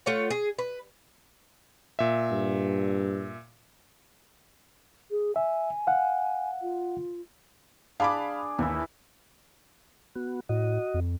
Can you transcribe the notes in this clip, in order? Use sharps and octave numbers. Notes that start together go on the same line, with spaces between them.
A3 F4 C#5 F#5
G#4
B4
A#2 E5
G2
G#4
E5 G#5
F5 F#5
F4
D4 G#4 F5 B5 D6
D#2 E3 E4
B3 F#4
A2 F#4 D#5
F2